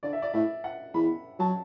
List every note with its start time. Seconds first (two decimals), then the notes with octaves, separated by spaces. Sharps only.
0.03 D3 D5
0.13 E5
0.22 D5
0.33 A2 E5
0.64 F#5
0.94 E2 B5
1.39 F#3 A5